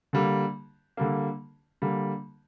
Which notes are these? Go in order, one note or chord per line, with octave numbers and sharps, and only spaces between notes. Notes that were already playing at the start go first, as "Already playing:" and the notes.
D3 G3 A#3
D3 G3 A#3
D3 G3 A#3